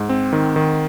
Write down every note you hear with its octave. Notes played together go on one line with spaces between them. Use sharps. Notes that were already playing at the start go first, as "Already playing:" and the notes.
Already playing: G#2
C4
D#3
D#3